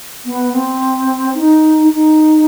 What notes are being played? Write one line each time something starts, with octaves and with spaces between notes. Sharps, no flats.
B3
C4
D#4
D#4